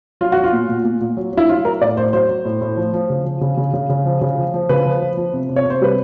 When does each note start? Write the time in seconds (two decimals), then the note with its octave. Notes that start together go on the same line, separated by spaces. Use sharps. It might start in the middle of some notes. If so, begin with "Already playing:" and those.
0.21 F#3 F4
0.32 F#3 F#4
0.44 F4
0.53 A#2
0.69 A#2
0.84 A#2
1.01 A#2
1.17 F#3
1.33 F#3 E4
1.49 F#3 F4
1.65 F#3 A#4
1.81 A2 D5
1.97 A2 C5
2.13 F#3 C5
2.29 F#3
2.45 A2
2.61 A2
2.77 F3
2.93 F3
3.10 C#3
3.25 F3
3.41 C#3
3.57 C#3
3.73 C#3
3.89 C#3
4.05 F3
4.21 C#3
4.37 F3
4.54 F3
4.69 C#3 B4
4.85 F3
5.01 F3
5.17 F3
5.33 C3
5.49 C3
5.56 C#5
5.65 C3
5.70 C5
5.82 G3 B4